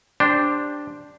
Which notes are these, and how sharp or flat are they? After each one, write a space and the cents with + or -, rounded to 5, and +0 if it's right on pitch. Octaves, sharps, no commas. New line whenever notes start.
D4 +0 G4 +10 C5 +0